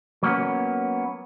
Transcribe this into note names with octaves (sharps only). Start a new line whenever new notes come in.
F#3 A#3 B3 C#4